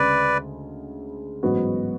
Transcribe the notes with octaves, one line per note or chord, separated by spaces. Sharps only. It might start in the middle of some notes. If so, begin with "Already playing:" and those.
Already playing: D2 C#3 G#3 B4 D5
A1 G#2 F#3 B3 F#4